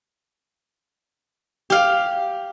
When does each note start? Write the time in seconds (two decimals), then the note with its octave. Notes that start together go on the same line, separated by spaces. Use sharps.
1.70 G4 F5